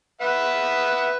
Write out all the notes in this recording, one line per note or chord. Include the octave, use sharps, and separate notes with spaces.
B4 E5 F#5